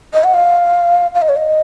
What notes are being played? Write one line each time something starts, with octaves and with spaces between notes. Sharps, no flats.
D#5
F#5
F5
F5
D#5
C#5
D#5